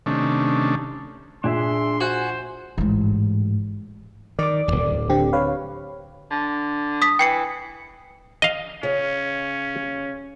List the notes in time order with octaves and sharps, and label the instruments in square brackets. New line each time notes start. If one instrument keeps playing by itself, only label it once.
[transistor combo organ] C3 D#3 A3 C#4 D4
[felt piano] A#2 [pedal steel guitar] D4 G#4 E5 [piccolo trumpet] C6
[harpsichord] F#4 [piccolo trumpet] C5 [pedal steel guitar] G#5
[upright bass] A1 G#2
[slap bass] D#3 [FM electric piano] D5 D6
[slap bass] D1 G#1
[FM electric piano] D3 C4 G4
B4 C#5 F5
[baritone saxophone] D3
[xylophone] D#6 B6
[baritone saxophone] E3 [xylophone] G5 C7 C#7
[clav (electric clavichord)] D#5 F5
[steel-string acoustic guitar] C#3 [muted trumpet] C#4